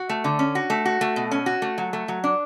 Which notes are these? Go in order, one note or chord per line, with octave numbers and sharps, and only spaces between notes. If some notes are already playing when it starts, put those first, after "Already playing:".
Already playing: F#4
A3
D3
C#4
F#4
A3
F#4
A3
B2
C#4
F#4
A3
F#3
A3
F#3
D4